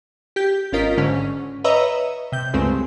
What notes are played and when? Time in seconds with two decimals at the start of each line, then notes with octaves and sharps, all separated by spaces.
0.36 G4 G6
0.72 G#1 C#4 F4 A#4 D#5 B6
0.97 G#2 D3 C#4
1.64 B4 C#5 D#5 E5 A#5 E6
2.32 C3 G6
2.53 C#2 G2 C#3 G#3 A3 C4